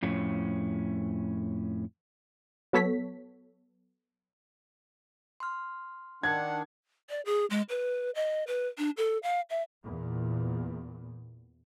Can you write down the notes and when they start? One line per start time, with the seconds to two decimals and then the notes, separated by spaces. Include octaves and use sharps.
0.03 F2 A2 C#4
2.73 F#3 B3 A4 C#5 B6
5.40 C6 F6
6.23 D#3 D4 F#5 G#6
7.10 D5
7.26 G#4
7.50 G#3
7.69 B4
8.15 D#5
8.47 B4
8.78 D4
8.97 A4
9.23 F5
9.50 E5
9.85 E2 A#2